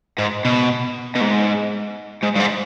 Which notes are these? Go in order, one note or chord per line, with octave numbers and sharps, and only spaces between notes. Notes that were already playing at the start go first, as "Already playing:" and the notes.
G#2
B2
B2
G#2
G#2
G2
G#2